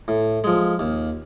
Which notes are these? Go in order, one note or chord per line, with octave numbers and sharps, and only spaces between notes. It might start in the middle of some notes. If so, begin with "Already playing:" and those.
A2
F3 G#3
D#2